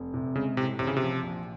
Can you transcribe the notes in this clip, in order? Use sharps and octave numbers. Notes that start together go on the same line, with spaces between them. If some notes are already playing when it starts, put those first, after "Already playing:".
Already playing: F1
C3
C#3 G#3
A2 C3
A1 C3
C#3
C3 F3
A#1